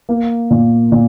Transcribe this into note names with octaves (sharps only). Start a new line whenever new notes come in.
A#3
A#2
A#2